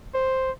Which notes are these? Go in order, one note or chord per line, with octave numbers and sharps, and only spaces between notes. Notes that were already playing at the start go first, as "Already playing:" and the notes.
C5